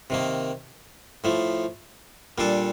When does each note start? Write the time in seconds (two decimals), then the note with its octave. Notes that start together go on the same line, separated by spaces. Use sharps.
0.10 C3 D#3 A#3
1.24 A2 F3 A3
2.38 A#2 G3 D4 A4